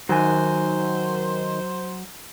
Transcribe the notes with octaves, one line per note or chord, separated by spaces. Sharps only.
D#3 F#3 C5 G#5